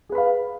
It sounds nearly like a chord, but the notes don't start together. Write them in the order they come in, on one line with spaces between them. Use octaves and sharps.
G#4 B4 B5 F5